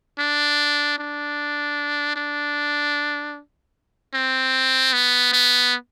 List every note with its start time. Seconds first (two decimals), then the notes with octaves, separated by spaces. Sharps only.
0.19 D4
0.99 D4
2.16 D4
4.14 C4
4.93 B3
5.33 B3